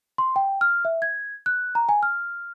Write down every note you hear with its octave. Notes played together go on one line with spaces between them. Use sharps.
C6
G5
F6
E5
G#6
F#6
A#5
G#5
F6